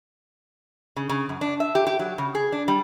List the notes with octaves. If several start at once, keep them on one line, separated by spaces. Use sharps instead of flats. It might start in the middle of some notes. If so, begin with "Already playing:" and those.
C#3
C#3
F#2
D4
E5
G4
G4
F#3
C#3
G#4
D4
G3